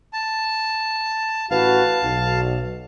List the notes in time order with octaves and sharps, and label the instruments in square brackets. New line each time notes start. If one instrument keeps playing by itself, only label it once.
[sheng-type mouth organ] A5
[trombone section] A1 F#4 B4 [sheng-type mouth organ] F5 A5
[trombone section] B1